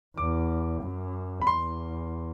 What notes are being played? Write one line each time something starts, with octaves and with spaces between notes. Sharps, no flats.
E2 D6
F#2
B5
E2 C6